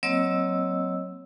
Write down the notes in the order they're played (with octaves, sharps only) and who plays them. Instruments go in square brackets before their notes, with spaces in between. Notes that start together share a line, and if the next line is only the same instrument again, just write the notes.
[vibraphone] F#3 A#3 C4 C#5 D#5 E6